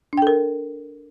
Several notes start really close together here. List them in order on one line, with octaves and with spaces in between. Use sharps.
D4 G5 A4 A#4